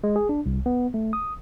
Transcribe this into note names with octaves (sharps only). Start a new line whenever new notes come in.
G#3
G#4
D4
C2
B3
A3
D#6